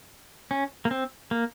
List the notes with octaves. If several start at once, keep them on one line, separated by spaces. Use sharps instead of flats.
C#4
A#3
C4
A#3